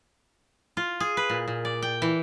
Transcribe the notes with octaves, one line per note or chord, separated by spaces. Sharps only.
F4
G#4
B4
A#2
A#2
D5
G5
E3